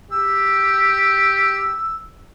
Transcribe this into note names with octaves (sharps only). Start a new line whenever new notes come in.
G4 E6